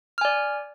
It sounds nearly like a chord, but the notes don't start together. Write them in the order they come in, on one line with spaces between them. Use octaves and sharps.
F6 G#5 D5